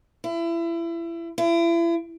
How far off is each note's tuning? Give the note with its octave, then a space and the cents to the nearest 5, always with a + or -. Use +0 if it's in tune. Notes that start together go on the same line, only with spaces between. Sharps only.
E4 +30
E4 +35